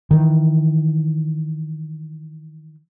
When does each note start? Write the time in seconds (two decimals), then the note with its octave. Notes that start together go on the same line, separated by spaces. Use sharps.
0.11 D#3 E3